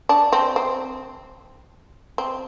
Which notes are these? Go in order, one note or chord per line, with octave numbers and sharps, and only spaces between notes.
D4
C4
C4
C4